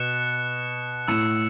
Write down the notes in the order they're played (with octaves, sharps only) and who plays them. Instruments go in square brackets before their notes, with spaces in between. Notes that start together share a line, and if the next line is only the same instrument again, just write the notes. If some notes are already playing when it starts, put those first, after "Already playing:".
Already playing: [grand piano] B2 [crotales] F#6 C#7 E7
[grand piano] A2 [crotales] E6 C#7 E7